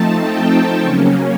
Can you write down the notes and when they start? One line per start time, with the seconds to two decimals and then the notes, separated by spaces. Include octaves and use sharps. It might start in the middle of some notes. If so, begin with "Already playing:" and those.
Already playing: F3 A3 C4 D#4 A5
0.20 G5
0.80 C#3 F#3 A#3 C#4 C#6